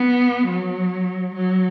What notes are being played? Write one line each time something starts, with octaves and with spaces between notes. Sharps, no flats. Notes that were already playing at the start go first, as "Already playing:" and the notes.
Already playing: B3
F#3
F#3